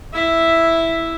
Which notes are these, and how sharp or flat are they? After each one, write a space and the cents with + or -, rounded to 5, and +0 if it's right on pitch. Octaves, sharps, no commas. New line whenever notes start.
E4 +0 E5 +0